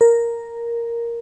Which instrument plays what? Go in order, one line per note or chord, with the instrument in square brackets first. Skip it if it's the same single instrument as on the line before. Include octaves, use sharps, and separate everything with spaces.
[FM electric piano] A#4